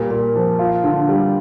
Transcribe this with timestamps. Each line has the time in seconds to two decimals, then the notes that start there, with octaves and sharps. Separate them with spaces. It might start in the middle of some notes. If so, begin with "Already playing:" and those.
Already playing: A#2 G3
0.11 A#2
0.36 F3
0.59 F4
0.84 D3
1.09 G3